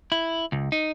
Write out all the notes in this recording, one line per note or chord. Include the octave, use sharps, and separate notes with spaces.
E4
C#2
D#4